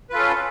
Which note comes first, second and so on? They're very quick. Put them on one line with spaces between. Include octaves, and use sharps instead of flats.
B4 F4 A4 C#4